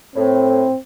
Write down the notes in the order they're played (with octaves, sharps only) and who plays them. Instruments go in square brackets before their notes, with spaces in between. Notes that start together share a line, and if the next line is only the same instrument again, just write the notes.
[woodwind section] A2 [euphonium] C4